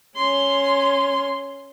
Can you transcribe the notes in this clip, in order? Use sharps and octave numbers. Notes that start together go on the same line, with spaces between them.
C#4 C6